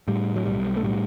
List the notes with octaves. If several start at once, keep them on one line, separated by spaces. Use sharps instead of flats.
A2 G3
F#3
B1 G3
A3
A2 G3